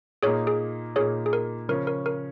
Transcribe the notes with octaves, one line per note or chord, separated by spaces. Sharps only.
A#2 A#3 D#4 G#4 C#5
G#4
A#2 A#3 D#4 G#4 C#5
G#4
A#4
C#3 F3 C#4 A#4
A#4
A#4